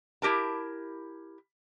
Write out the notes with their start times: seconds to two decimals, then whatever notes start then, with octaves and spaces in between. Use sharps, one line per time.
0.22 E4 F4 G4 A#4 A5